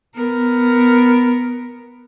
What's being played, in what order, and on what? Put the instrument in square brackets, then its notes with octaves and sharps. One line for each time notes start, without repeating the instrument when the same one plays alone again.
[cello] B3 A#4